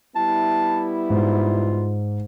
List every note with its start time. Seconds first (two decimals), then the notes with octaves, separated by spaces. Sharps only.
0.16 G3 B3 E4 A5
1.10 G#2 F4